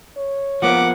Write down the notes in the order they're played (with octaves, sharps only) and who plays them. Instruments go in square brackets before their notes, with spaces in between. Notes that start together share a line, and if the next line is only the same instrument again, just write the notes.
[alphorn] C#5
[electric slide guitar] F3 A#3 B3 [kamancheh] F#5 D6